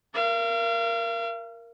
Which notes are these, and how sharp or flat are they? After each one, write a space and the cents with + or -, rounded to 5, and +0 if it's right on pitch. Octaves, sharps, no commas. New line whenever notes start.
A#4 +0 F5 -40